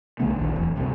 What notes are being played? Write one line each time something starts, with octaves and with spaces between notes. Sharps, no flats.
C2 C#3 A3 B3
A#1 D#2 D3
D1 E2
D2 G2 C3